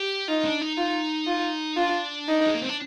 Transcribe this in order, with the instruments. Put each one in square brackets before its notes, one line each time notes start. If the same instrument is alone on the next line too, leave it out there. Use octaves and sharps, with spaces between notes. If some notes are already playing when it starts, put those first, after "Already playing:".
Already playing: [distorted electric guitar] G4
[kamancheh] D#4 [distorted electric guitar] F4
[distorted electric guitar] D4
D#4
[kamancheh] F4
F4
[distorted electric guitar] D4 [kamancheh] F4
[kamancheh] D#4
[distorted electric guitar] G#3
A#3
C4
D4